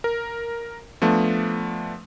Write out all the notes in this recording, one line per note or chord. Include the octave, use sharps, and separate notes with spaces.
A#4
F3 A3 B3 D4